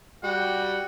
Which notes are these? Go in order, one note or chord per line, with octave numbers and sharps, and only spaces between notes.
G3 F#4 F#5 G5